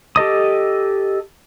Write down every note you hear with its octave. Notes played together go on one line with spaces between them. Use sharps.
G4 A4 D#5 D#6